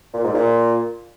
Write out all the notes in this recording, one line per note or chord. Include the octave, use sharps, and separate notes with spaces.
A#2
G#2
A#2